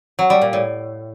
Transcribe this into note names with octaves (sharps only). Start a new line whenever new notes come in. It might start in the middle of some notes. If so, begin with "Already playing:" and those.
F#3
G3
A#2
A2